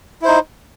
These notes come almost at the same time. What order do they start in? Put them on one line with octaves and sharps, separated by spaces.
E4 C5 D#4